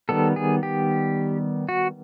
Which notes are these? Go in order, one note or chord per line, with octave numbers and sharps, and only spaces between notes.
D#3 G3 B3 A4
G#4
G4
F#4